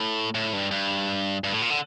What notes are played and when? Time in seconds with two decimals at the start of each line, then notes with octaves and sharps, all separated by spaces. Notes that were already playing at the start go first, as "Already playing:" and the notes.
Already playing: A2
0.35 A2
0.53 G2
0.71 G2
1.44 G2
1.52 A2
1.62 A#2
1.70 D3